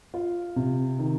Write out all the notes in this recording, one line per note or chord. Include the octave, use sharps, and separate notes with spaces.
F4
C3
D#3